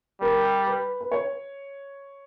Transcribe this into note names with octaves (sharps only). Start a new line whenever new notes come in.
G3 A#4
B4
B4
C#5